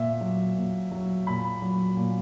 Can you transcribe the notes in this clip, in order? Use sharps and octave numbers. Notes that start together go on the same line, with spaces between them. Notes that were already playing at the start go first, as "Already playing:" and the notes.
Already playing: A#2 E5
F#3
A#2
F#3
A#2 B5
F#3
A#2